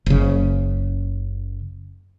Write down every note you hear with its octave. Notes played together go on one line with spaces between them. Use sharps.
F#1 C#3